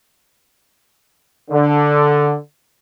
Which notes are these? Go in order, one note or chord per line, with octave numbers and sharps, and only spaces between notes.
D3